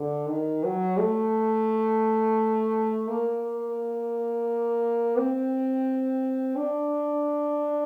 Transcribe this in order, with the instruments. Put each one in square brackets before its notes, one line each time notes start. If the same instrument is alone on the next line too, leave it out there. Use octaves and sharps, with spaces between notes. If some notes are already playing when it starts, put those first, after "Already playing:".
Already playing: [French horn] D3
D#3
F#3
A3
A#3
C4
D4